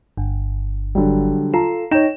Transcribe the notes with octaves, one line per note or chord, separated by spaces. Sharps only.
G1
D3 F#3 G3
F4 A4 A#5
D#4 C#5 G5 E7